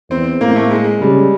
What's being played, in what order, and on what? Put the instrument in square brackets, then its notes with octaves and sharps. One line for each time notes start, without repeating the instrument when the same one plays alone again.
[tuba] E2 [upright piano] C4
[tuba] A2 [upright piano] A#3
[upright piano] A#3
A3
G#3
[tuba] C#3 [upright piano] G3